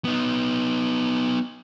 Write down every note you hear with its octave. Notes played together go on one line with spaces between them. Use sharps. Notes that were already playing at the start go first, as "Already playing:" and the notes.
B3 D#4